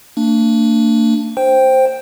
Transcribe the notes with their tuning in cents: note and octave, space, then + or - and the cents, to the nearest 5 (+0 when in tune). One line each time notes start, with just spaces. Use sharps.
A#3 -45 D4 +0
C5 +5 G5 +0